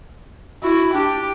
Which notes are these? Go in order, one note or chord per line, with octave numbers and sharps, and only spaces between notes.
E4 F#4
D4 G4